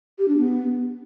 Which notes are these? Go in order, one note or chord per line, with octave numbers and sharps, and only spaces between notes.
G4
D4
B3